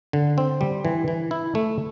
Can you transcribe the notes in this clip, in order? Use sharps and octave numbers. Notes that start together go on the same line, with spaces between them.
D3
C4
G3
E3
E3
E4
A3